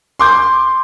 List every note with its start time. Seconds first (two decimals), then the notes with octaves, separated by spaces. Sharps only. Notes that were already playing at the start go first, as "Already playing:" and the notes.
0.19 C6 D6 G6